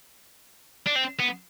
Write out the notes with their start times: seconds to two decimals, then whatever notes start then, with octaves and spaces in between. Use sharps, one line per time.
0.86 D4
0.95 C4
1.19 B3